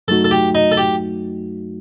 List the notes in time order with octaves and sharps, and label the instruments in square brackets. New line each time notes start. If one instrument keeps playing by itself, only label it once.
[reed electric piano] F#2 F#3 A3 D#4 F#4 [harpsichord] A4
[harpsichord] A4
G4
D#4
A4
G4